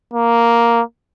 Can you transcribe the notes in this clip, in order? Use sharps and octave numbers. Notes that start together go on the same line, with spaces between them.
A#3